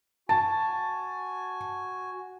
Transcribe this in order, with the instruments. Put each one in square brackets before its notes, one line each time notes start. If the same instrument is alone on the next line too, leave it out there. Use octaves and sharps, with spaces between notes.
[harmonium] F#4 G#5 [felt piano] A5